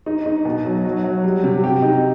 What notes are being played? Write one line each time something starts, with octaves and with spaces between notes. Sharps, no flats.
D#4
D#4
B2
F#3
F#3
F#3
G3
C3
G4
D#4